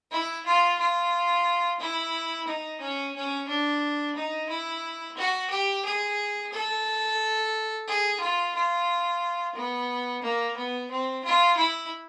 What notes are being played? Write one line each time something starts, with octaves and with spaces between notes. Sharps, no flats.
E4
F4
F4
E4
D#4
C#4
C#4
D4
D#4
E4
F#4
G4
G#4
A4
G#4
F4
F4
B3
A#3
B3
C4
F4
E4